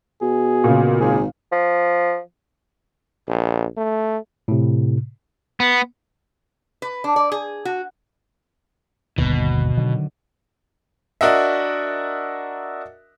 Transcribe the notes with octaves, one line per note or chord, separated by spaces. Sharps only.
B2 G#4
A#2 C#3
G#1 G#4
F3
A#1
A3
A2 C3
B3
B4
D4
D5
G#4
F#4
G1 D#2 B2
D3 D#3 F#3
D4 F#4 A#4 D#5 E5